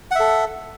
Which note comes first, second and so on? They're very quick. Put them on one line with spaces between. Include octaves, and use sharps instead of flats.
F#5 E5 A4